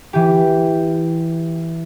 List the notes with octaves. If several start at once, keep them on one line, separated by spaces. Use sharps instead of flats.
E3 G4